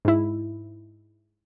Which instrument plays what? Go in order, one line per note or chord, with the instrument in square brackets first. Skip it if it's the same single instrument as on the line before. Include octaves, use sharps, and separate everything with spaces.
[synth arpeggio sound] G#2 E4